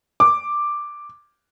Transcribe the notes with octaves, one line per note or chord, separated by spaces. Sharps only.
D6